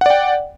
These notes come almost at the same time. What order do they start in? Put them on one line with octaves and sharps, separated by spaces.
F#5 D5 G5